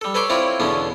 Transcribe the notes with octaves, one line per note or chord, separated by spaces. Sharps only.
G3 A4
A4 B4 C#5 A5 C6 D6
C4 E4 F4 C#5 D5
E2 B2 D3 B3 C#4